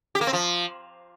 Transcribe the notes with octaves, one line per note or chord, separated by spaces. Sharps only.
G4
A#3
C4
F3